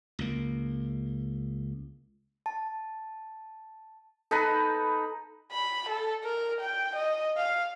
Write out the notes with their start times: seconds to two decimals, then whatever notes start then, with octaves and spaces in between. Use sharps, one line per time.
0.19 C#2 A#3
2.46 A5
4.31 D#4 A4 B4 A5 A#5
5.51 B5
5.89 A4
6.23 A#4
6.61 G5
6.95 D#5
7.37 F5